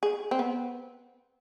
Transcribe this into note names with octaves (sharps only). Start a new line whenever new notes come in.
G#4
C4
B3